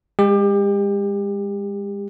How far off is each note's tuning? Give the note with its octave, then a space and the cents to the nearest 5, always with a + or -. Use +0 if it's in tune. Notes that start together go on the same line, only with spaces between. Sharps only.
G#3 -35 G4 +30